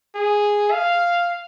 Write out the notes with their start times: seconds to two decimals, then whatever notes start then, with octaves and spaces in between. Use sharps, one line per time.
0.15 G#4
0.72 F5